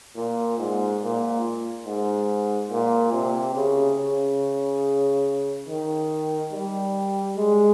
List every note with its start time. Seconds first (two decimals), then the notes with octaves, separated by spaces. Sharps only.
0.16 A#2
0.58 G#2
1.01 A#2
1.86 G#2
2.70 A#2
3.13 C3
3.55 C#3
3.98 C#3
5.68 D#3
6.52 G3
7.37 G#3